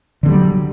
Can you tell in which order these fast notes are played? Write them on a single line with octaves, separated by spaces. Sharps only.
D3 C4 G3 F#3